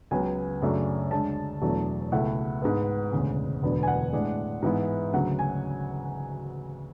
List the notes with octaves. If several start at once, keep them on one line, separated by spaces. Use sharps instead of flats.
C#2 C#3 F#3 B3 G#5
F#2 C#3 F#3 A3 D4
D2 D3 G#3 A5
E1 E2 D3 F#3 A3
C#2 B2 A3 E4 F#5
G#2 G#3 B3
E1 D2 C#3 G#3
E1 D2 D3 F#3 B3
G#5
F#5
A2 G#3 D4
G#2 E3 B3 E4
D2 C#3 F#3 F#5
G#5